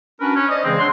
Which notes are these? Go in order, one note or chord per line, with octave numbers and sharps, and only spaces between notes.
C#4 D4 F#4 A#4 B4
C#4
C5 D5 D#5
C#3 E3 G#3 C4
D4 C#5 F#5 C6